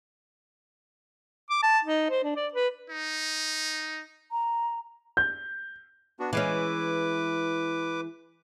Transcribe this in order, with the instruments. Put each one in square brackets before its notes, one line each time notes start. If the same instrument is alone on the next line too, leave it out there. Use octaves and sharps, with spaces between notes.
[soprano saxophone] D6
A5
D#4
C5
D4
D5
B4
[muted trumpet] D#4
[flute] A#5
[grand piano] G6
[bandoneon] B3 D4 F#4
[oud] E3 G#3 C#4 [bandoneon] B4 D6